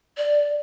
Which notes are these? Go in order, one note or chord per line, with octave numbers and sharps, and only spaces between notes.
D5